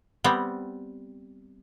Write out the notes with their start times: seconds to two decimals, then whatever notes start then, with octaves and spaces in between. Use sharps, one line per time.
0.24 G3 B3 C4